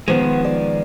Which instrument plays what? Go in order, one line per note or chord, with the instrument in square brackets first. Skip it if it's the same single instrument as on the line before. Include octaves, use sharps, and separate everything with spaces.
[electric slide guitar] D#3 F3 G#3 [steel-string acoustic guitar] B3 C5
[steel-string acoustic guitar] D5